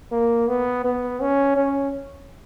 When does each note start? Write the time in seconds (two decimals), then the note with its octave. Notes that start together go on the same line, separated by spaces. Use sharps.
0.11 A#3
0.48 B3
0.84 B3
1.20 C#4
1.56 C#4